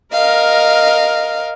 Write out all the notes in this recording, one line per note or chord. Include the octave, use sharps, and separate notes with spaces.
A#4 D#5 F5